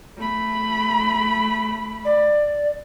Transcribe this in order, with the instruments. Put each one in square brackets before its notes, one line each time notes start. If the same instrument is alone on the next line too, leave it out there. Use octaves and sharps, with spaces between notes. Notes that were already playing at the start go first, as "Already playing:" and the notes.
[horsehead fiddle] A3 B5
[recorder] D5